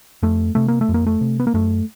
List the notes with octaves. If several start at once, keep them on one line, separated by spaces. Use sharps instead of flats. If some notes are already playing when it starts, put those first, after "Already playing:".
F2 A3
C3 A3
A#3
A3
F2
A#3
A3
C3
B3
A#3
F#2 A3